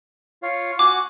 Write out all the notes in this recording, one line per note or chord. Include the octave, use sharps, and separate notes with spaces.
F4 C#5 F5
F#4 F#5 G#5 D6